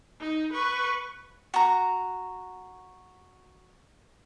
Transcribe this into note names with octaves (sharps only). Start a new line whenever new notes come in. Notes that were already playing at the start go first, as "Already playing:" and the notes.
D#4
B4 C#6
F#4 A#5